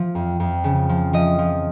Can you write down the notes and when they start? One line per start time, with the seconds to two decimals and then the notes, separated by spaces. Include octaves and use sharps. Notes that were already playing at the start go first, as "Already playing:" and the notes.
Already playing: F3
0.15 F2
0.40 F2
0.64 C#3
0.89 F3
1.13 F3 D#5
1.39 F3